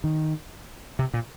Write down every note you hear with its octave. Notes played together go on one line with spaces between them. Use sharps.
D#3
C3
A#2